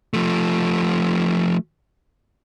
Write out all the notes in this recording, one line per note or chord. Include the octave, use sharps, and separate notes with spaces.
F3 A3